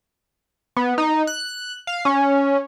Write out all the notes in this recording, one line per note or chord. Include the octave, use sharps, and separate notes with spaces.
B3
D#4
F#6
F5
C#4